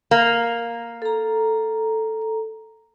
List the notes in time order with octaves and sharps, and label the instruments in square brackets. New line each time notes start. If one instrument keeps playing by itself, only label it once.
[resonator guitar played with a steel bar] A#3
[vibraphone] A4 A#5